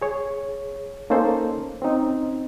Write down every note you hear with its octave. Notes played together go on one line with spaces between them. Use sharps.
G#4 C#5
A#3 C#4 D#4 A4 C5
C4 C#4 D#4